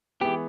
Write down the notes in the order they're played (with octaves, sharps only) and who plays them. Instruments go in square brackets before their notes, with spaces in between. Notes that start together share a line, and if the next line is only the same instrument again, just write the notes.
[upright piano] E3 G#3 B3 [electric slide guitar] G4